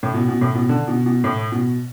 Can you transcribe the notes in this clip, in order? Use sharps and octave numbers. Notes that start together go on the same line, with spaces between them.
A2
B2
B2
A2
B2
D3
B2
B2
A2
B2